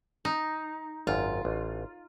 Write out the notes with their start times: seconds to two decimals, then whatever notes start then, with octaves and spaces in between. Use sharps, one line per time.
0.25 D#4
1.07 G#1 F#2 F4
1.45 A1